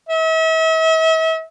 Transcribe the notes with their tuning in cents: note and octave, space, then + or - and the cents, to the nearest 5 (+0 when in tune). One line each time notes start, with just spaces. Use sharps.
E5 -40